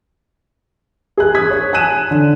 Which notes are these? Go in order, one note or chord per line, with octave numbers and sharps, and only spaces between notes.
G#4 F#6
D#6 G#6 B6
C#5
G#5 A5 F#6 D#7 E7
D3